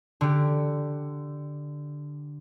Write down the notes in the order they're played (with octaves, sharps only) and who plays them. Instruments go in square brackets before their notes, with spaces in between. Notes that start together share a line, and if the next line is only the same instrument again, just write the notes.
[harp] D3 G4